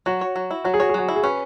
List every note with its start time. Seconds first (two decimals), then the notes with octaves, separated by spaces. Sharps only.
0.06 F#3 F#4
0.21 C#5
0.36 F#3
0.51 E4
0.64 F#3 F#4
0.74 G#4
0.80 F#4 C#5
0.89 G#4
0.94 F#3 F#4
1.09 E4
1.16 G#4
1.24 C#4 B4